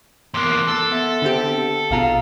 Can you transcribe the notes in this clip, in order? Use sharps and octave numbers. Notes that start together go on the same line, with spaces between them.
E2 A#3 C6 D6 F#6
A4
B3 E5
D3 C4 G4
A#1 B2 F4 G#4 F5 A#5